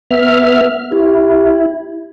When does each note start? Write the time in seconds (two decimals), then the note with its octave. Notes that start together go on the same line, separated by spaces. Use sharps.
0.11 B3 E5 F6
0.92 E4 G4